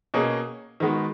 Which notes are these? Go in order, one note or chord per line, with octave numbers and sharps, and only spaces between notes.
B2 A#3 C#4 G#4
D#3 G#3 B3 F#4